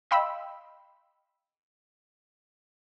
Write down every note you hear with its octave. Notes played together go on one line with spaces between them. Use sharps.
D#5 F5 G5 B5 C6 E6